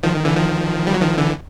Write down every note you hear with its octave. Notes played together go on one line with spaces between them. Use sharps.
D#3 F3
D#3
D3 E3
D#3 F3
G3
F#3
D#3 F3
D3 E3